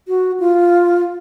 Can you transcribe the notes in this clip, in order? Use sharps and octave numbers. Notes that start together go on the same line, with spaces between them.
F#4
F4